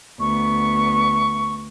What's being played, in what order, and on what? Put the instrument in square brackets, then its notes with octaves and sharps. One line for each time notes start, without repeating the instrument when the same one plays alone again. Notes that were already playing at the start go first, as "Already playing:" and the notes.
[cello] D2 B3 [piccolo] C#6